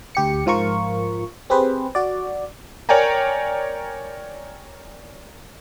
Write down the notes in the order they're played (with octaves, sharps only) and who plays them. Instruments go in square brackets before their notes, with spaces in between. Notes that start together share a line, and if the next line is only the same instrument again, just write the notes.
[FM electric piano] D2 G4 C#7
G#2 F3 F4 A#4 C#6
C4 G4 G#4 B4 C5
F#4 D5
[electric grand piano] A#4 C#5 D5 G5 G#5 A#5